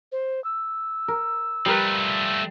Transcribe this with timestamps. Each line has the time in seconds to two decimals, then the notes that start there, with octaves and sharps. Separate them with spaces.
0.12 C5
0.44 E6
1.08 A#4
1.66 F3 G3 A3 A#4 B4